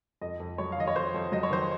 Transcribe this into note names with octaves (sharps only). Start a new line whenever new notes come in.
F2 D#5
F2
F#3 C#5
F5
D#3 D#5
C#5
F2 C5
F2
F#3 D#5
C#5
D#3 C5